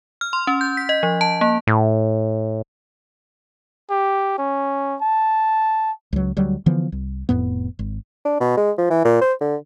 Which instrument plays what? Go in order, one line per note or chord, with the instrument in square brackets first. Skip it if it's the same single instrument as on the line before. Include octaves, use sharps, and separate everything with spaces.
[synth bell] F6
C6
C#4
G6
B6
D#5
F3
A5
A#3
[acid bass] A2
[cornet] G4
C#4
A5
[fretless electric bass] C#2 F#3
D2 F#3 G3
D3 E3 F3 B3
C2
F1 F2 A2 B3
G#1
[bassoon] D4
B2
G#3
F3
E3
A#2
C5
D3